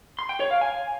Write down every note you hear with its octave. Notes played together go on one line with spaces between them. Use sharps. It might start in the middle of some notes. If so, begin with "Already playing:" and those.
C6
G5
C#5
F5
G#5